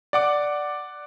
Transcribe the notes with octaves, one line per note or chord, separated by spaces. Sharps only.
D5 F#5 D6